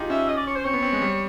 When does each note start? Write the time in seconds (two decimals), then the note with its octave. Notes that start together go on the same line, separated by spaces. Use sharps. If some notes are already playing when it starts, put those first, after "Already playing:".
Already playing: D#4 F4 G4 G#4
0.10 C#4 E5
0.28 D#5
0.37 D5
0.47 C#5
0.56 C5
0.65 C4 C#5
0.73 B3
0.82 C4
0.93 G#3
1.02 G3